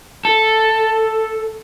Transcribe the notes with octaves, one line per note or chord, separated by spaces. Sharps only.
A4